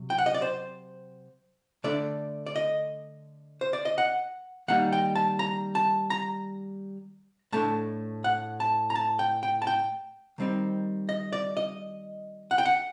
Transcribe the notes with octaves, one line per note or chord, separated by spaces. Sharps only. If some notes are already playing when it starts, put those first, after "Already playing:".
Already playing: C3 F#3
G5
F#5
D#5
D5
C5
D3 A3 D4 D5
D5
D#5
C5
D5
D#5
F#5
D#3 G3 A#3 D#4 F#5
G5
A5
A#5
A5
A#5
A2 A3 D4 A5
F#5
A5
A#5
A5
G5
G5
A5
G5
D#3 G3 C4 D#4
D#5
D5
D#5
F#5
G5
F#5